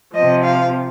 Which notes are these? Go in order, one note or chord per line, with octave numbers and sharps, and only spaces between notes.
C3 F3 D#5
F5